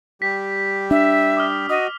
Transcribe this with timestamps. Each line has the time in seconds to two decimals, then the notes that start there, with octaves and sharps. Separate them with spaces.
0.22 G3 G4 B6
0.91 D4 E5
1.37 D6 D#6 F6
1.70 F#4 D#5 D#6